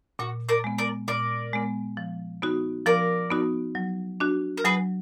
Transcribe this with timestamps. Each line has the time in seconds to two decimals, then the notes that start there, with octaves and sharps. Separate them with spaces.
0.19 A#2 F#4
0.49 A#4 D5
0.64 G#3 B3
0.78 A#4 D5
1.08 A#2 A#4 D5
1.53 G#3 B3
1.97 F3
2.42 B3 D#4 F#4
2.86 F3 A#4 D5
3.30 B3 D#4 F#4
3.75 F#3
4.20 D4 F#4
4.57 A#4
4.65 F#3 G#4 B4